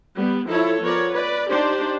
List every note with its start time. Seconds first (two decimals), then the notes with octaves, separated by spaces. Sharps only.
0.17 G3 B3
0.49 F3 E4 A4 C#5
0.82 F3 B3 A#4 C#5 D5
1.12 B4 D5
1.50 D4 D#4 G4 C5 D5